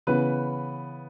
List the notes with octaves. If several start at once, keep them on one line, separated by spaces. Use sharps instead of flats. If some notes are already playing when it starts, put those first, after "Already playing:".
C#3 E3 B3 B4